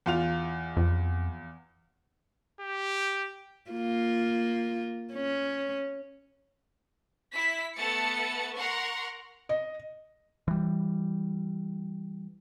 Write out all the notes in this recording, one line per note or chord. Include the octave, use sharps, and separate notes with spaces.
E2 F4 F7
F2
G4
A#3 F4
C#4
E4 B6
A3 B3 A4 F#5 A6 C#7
A#4 F#5 A#5 C6 C#6
D#5
E3 G3